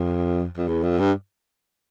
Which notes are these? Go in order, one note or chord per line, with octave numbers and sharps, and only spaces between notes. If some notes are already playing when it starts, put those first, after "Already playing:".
Already playing: F2
F2
E2
F2
G2